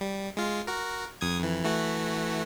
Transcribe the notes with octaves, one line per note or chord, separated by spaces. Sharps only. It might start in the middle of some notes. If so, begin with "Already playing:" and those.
G3
G#3 F4
F#4 A#4
F2 D#6 G#6
F2 E3
E3 A3 F#4